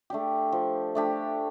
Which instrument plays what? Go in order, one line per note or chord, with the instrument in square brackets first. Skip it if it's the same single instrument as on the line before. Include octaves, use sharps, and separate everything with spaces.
[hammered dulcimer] A3 D4 G4
F3
A3 D4 G4